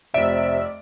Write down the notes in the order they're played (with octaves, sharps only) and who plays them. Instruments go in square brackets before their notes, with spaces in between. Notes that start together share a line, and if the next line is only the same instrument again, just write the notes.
[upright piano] F1 D7 [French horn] C3 [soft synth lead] D5 [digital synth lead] E5